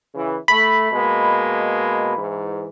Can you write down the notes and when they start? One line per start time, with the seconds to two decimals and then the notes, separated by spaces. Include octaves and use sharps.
0.13 C#3 E3
0.48 A3 B5
0.92 B2 G#3 A#3
2.16 G#2 E3